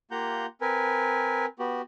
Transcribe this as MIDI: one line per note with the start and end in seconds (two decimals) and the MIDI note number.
0.11 0.46 58
0.11 0.46 65
0.11 0.46 67
0.11 0.46 78
0.11 0.46 82
0.11 0.46 91
0.61 1.46 60
0.61 1.46 70
0.61 1.46 71
0.61 1.46 80
1.59 1.82 59
1.59 1.82 66
1.59 1.82 67